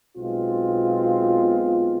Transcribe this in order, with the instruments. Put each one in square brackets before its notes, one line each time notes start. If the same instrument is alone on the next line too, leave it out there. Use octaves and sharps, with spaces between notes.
[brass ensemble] B1 B2 G#3 C4 F4